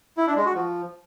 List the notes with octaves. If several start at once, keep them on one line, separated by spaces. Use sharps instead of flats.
E4
D4
G#3
F#4
F3